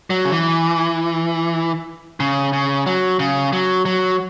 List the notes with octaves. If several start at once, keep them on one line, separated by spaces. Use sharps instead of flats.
F#3
C#3
E3
C#3
C#3
F#3
C#3
F#3
F#3